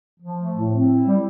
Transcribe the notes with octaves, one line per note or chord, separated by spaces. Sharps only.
F3
A3
A2
C4
E4
G3